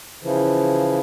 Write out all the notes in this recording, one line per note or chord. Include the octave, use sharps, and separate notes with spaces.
C#3 E3 F3